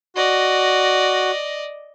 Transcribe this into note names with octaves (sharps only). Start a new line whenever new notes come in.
F#4 D5 D#5